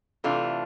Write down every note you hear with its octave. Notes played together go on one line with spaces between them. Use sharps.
C3 E3 A3 D4 F4